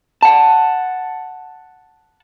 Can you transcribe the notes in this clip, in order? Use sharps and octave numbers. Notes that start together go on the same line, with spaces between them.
F#5 A5